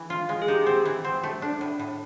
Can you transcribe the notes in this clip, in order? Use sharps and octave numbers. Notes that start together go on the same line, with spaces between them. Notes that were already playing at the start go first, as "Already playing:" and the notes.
Already playing: E3
F4
G#3
G#4
D#4 G4
C4
E3
C4
A3
D4
A2
A2